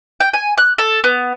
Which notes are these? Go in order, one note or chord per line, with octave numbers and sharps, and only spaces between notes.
G5
G#5
F#6
A4
B3